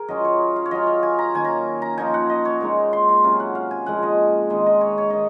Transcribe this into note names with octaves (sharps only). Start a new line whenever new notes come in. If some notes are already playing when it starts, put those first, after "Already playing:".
Already playing: G#4 A#4
F#3 C#4 F4 D#5
C#5
F5
C#5
F#3 C#4 F4 D#5
F5
G#5
A#5
D#3 A#3 C#4 G#5
A#5
A#5
F3 A#3 D#4 G#5
F#5
D#5
C#5
A#2 G#3 D#4
C6
C6
C3 F#3 C#4 F4
F#5
F5
G#5
A#2 F3 G#3 F#5
D#5
D#3 G#3 C4 D#5
D#5
C#5
C#5
D#3 D#5